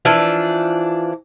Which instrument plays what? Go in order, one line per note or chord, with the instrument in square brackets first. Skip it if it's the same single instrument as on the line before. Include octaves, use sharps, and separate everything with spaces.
[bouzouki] E3 F3 D4